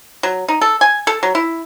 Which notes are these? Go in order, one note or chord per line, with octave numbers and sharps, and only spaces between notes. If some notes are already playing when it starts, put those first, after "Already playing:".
F#3
D#4
A4
G#5
A4
F#3
E4